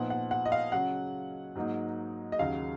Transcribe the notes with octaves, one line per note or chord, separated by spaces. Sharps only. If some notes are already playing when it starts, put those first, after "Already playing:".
Already playing: A#2 F3 B3 D#4 F#5
F#5
F#5
D#5
F5
C#3 F#3 C#4 F#5
G#2 F#3 A#3 D#4
D#5
D#2 C#3 F#3 F5